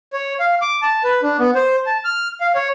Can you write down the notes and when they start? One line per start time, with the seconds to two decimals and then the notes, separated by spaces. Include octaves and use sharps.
0.13 C#5
0.40 F5
0.61 D6
0.82 A5
1.04 B4
1.22 D4
1.39 B3
1.55 C5
1.86 A5
2.05 F6
2.41 F5
2.55 C#5